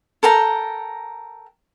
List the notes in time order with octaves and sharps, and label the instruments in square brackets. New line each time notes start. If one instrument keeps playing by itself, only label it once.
[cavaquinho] A4 A#4 G5 A#5